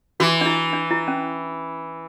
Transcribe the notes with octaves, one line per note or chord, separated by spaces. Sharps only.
E3 F#4
D4
E4
D4
E4
C#4